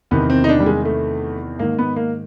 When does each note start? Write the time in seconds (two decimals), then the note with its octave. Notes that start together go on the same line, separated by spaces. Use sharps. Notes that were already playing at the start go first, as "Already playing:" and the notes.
0.11 E2 C3 D#3 B3
0.30 C4
0.44 D#4
0.49 D4
0.60 G3
0.66 G#3
0.85 A3
1.59 G#2 D#3 A#3
1.79 B3
1.96 A#3